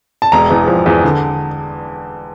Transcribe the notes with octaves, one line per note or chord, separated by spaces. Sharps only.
A5
E1 A#5
E2
F3
E2
D3